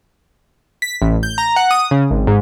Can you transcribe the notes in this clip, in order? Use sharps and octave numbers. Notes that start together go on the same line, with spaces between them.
B6
A1
G6
A#5
F#5
D#6
C#3
G#1
G#2